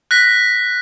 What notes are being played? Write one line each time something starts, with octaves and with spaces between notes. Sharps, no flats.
F#6 A#6 B6